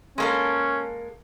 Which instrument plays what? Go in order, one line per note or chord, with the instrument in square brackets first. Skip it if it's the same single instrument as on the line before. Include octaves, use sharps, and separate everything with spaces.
[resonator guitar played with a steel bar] G#3 A#3 A4 [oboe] C#4